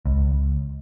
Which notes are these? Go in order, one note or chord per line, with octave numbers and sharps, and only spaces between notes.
C#2